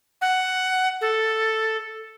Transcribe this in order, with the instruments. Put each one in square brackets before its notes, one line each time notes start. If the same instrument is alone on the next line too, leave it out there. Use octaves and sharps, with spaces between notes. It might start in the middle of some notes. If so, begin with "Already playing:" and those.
[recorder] F#5
A4